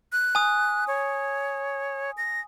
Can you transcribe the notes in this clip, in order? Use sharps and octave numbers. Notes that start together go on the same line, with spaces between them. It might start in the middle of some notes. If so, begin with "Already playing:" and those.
F#6
G#5 D#6
C#5
A#6